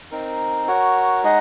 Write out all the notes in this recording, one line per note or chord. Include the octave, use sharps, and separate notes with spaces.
C4 D#4 A#4
F#4 A#4 C#5 F#5
G#3 D#4 G#4 D#5 F#5